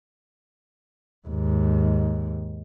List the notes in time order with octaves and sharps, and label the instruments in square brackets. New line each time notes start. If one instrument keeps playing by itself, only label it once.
[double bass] D#2 G#2